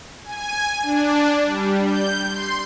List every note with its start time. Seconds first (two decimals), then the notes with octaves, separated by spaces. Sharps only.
0.25 G#5
0.83 D4
1.44 G3
1.85 G6
2.30 C6